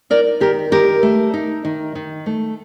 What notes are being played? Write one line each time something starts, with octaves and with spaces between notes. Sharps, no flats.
D#4 A#4 D5
D#3 G4 A#4
D#3 G4 A#4
A3
D#4
D#3
D#3
A3